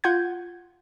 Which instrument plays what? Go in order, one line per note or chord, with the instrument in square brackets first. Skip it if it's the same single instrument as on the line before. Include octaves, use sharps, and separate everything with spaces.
[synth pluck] F4 F#5 G6 G#6